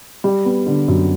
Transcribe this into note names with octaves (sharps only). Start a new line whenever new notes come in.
G3
B3
D3
F#2